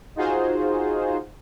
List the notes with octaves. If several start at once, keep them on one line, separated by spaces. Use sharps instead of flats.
D#4 F4 F#4 G#4 C5